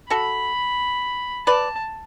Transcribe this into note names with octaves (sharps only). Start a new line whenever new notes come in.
F#4 A4 B5
B4 D5 A5